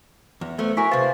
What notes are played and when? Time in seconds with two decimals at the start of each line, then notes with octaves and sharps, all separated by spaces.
0.41 E2
0.58 F3 A3 B3
0.77 E4 F#4 A#4 G#5 C#6 B6
0.91 C3 B4 C5 F5 A6